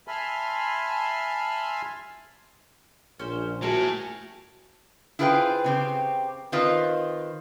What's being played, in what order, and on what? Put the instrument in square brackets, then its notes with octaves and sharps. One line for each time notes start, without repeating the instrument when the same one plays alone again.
[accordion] E5 G#5 A5 B5 C6 F6
[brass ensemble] A#1 [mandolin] C#4 C5
[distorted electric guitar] A2 [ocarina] F#4 [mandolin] G#4 A#4 A#5
[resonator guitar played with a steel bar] E4 F4 G#4 B4 C5 G5
C#3 C4 G4
D#3 C4 F4 B4 C5 D#5